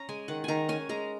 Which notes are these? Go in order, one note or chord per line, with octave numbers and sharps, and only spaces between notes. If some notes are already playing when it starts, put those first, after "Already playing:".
Already playing: C#4 A#5
G#3 G#5
D#3 F#5
D#3 G#5 A#5
C#4 G#5
G#3 A#5